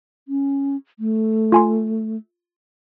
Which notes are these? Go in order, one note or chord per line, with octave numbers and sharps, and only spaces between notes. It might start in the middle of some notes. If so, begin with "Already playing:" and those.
C#4
A3
F4 G#5 C6